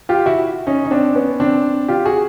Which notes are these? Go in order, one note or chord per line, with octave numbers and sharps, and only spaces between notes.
F4 G4
E4 F#4
C#4 D#4
D#4
C4 D4
B3 C#4
C4 D4
F4 G4
F#4 G#4